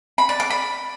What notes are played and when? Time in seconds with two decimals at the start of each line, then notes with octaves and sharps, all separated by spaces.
0.18 B5
0.29 D5
0.40 D6
0.50 B5